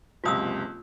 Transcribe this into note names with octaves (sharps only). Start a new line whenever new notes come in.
F#1 C#2 C3 F4 D#6 E6